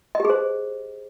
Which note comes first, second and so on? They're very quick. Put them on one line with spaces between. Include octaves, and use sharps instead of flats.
D#5 G4 G#4 C5